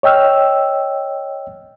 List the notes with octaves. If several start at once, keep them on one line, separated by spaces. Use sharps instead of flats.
C#5 D#5 G5 E6 F6